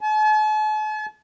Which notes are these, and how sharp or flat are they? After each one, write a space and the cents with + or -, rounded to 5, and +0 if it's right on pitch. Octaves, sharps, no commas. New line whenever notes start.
A5 -45